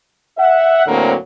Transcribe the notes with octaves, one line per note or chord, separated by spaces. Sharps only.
E5 F#5
D2 A2 D3 F#3 A#3 C4